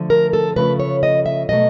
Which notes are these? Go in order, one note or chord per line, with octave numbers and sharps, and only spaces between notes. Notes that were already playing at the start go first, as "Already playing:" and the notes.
Already playing: D3 F3 A3
A#4
A4
C#3 F3 A3 B4
C#5
D#5
E5
B2 F#3 A3 D#5